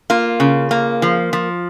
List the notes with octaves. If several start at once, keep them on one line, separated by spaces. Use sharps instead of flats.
A#3 F4
C#3
A#3
F3
F3